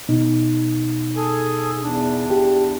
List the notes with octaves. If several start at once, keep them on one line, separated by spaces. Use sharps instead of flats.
B2 D#4
G#4 A4 G#5
E2 D4
G4